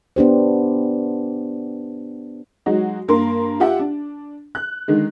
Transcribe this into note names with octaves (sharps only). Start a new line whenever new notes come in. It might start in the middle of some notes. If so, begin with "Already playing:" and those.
B3 D4 G4 C5
F#3 G#3 D#4 F#4
G2 A#3 A#4 C6
F4 G4 E5 F#5
D4
F#6
D3 D#3 G#3